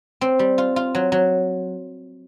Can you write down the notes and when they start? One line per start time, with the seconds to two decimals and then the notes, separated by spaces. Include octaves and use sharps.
0.21 C4
0.39 G3
0.58 F4
0.76 F4
0.95 F#3
1.12 F#3